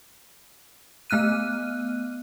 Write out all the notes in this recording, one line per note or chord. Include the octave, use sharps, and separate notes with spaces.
A3 B3 F6 F#6 D#7